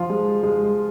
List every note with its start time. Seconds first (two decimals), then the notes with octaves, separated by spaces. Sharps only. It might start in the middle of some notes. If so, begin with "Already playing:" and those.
Already playing: F3 F4
0.10 G#3
0.43 G#3